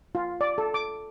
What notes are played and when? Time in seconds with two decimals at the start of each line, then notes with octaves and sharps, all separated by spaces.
0.15 F4
0.41 D5
0.58 A4
0.74 D6